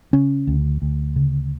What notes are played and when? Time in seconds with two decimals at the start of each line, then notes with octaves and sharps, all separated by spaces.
0.13 C#3 C#4
0.47 D2
0.82 D2
1.16 C#3